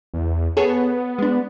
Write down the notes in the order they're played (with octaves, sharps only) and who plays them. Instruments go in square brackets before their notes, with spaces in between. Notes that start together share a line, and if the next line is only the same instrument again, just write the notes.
[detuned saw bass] E2
[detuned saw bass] B3 [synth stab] G#4 A4 C#5
[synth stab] G#3 D4